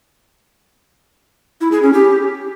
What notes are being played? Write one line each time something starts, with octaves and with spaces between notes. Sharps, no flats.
E4
G#4
C#4
G4